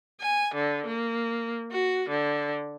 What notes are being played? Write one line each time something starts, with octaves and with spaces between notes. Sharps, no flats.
G#5
D3
A#3
F#4
D3